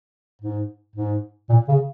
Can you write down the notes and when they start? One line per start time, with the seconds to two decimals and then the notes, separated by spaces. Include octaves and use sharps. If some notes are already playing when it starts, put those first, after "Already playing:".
0.41 G#2
0.96 G#2
1.49 A#2
1.68 C#3